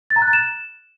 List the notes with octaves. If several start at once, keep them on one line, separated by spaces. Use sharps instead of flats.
A6
A#5
F#6
A6
E7